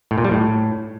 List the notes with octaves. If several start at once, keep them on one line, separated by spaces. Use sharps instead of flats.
A2
A#2
G3
A2